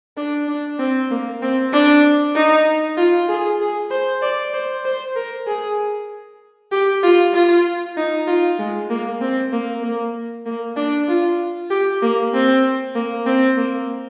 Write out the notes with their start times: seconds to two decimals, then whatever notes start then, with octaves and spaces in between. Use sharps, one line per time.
0.17 D4
0.48 D4
0.79 C4
1.11 A#3
1.42 C4
1.73 D4
2.35 D#4
2.97 F4
3.28 G#4
3.61 G#4
3.91 C5
4.22 D5
4.54 C5
4.85 C5
5.16 A#4
5.47 G#4
6.72 G4
7.03 F4
7.34 F4
7.97 D#4
8.27 F4
8.58 G#3
8.90 A#3
9.21 C4
9.52 A#3
9.83 A#3
10.46 A#3
10.76 D4
11.08 F4
11.70 G4
12.02 A#3
12.33 C4
12.95 A#3
13.26 C4
13.57 A#3